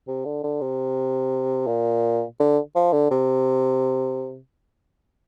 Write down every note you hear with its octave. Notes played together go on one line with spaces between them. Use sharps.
C3
D3
D3
C3
A#2
D3
F3
D3
C3